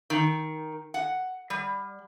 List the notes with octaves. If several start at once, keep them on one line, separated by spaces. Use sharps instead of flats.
D#3
F#5
G3